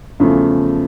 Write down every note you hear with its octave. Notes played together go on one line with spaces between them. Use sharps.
E2 C#3 F3 A3